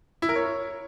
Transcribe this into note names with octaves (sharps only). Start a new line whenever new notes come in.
E4
A#4
C#5